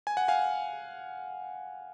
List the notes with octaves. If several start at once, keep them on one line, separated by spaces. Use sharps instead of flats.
G#5
F#5
F5 G#5